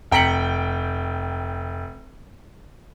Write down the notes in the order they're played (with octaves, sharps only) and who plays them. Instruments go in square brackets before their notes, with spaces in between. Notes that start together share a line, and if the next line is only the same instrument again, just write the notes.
[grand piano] F1 G5 A#5 B6 C#7 F#7